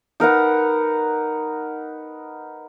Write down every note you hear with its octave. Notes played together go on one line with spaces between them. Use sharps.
D#4 A#4 B4 F#5